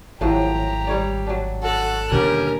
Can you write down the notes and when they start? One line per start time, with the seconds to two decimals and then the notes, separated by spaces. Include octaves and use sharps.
0.21 G#1 A2 F3 F#3 G4 A#5
0.87 G3 C#5 D5
1.27 F#3 D4
1.63 F#4 A4 F#6
2.11 D#2 B2 D3 G3 C#4 G4 A#4 F#5